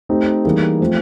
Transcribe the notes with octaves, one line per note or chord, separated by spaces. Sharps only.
A3 C4 D#4 G4
E3 G3 A#3 D#4 G#4
F3 A3 C4